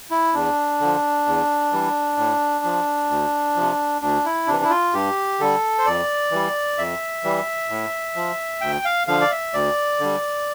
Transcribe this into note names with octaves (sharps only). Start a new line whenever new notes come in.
E4
E2 D4
D3 F3
E2
E3 G3
A2
F3
D2
C3 F3
D2 D4
E4
C3 E3 D4
E4
F4
G2 G4
D3 G3 A4
C5
F2 D5
E3 G3
F2 E5
E3 G3
A2
F3
D2 G5
F5
D3 F3 F5
D5
E5
D2 D5
D3 G3